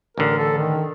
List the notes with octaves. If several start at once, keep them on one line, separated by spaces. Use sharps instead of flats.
A1 D3 A#4
A4
D#3